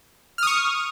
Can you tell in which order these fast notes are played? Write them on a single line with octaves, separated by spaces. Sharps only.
F6 D#6 C#6